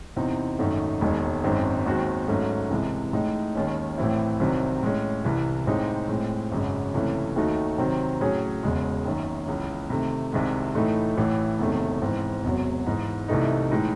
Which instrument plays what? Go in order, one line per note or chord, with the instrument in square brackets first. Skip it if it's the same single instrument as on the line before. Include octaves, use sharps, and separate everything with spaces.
[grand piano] E2 C3 E3 C4 D#4
G#1 F#2 D#3 A3 D#4
E1 D#2 D#3 G#3
G#1 F#2 D#3 G#3 C4
D#2 D#3 G#3 C4 F#4
G#2 F#3 A3 C#4
C2 C3 E3 G#3
A1 A2 G#3 D#4
D#2 D#3 G#3 C#4
A1 A2 E3 C4 E4
C2 C3 D#3 F#3 C4
A2 G#3 C#4
C2 C3 E3
A1 A2 G#3 C4 D#4
A2 G#3 C4
G#1 F#2 C#3 G#3
C#2 C3 E3 A3 C#4
D#2 D#3 A3 D#4 F#4
C3 D#3 F#3 C4
A2 F#3 C#4 G#4
E1 E2 C#3 G#3
F#1 F#2 D#3
C#2 C#3 E3
C3 D#3 A3
C2 C3 D#3 G#3
A2 E3 A3 D#4
A1 A2 E3
E1 E2 C3 D#3 A3
G#2 E3 C4
E1 E2 C3 F#3
G#2 E3 G#3 D#4
C2 C3 E3 A3 D#4
A2 E3 G#3 D#4